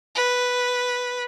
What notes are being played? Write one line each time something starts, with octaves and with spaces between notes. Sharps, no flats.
B4